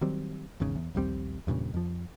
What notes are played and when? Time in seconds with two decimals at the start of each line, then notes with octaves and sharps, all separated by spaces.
0.01 D#3 F#3 G3 C4
0.60 G#1 E2 G#2 C#3
0.76 E2
0.95 A#1 D#2 G3 C4
1.47 E2 G2 A#2 C#3
1.74 F2 F3